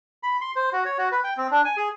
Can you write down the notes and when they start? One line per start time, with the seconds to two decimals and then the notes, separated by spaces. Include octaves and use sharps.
0.23 B5
0.41 C6
0.56 C5
0.73 F#4
0.85 C#5
0.98 F#4
1.12 B4
1.24 G5
1.37 C4
1.51 D4
1.65 G#5
1.77 G#4